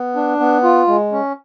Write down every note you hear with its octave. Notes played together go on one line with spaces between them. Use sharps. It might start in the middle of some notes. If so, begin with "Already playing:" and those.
Already playing: B3
D4
B3
F4
G#3
C#4